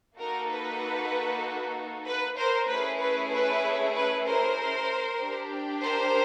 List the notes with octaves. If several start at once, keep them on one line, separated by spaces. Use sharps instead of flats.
A#3 D#4 F#4 A4 A#4
B4
B4
A#4 C5
A3 C#4 E4 G#4 B4
B4
B4
B4
A#4 C5
D4 G4
A#4 C5